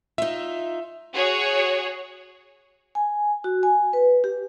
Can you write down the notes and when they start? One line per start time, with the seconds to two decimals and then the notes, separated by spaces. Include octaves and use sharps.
0.18 D#4 F4 E5
1.14 F#4 G#4 C#5
2.95 G#5
3.44 F#4
3.63 G#5
3.93 B4
4.24 G4